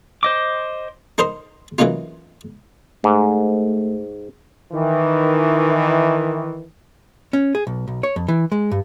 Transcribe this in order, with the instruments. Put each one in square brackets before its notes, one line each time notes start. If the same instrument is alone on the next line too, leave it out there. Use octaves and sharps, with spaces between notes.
[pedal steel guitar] C5 D#5 D6
[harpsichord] D#4 A#4 C5 D#5 C6
E3 F#3 A#3 C#4 D#4 F4
[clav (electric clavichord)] G#2 [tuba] A3
[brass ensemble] D#3 E3
[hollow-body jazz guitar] C#4
G#4
B1
B1
C#5
F2
E3
G#3
G2